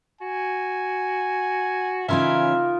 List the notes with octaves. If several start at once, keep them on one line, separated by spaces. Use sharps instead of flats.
F#4 G#5
C#3 E3 C#4 D#4 F4 A#4 E5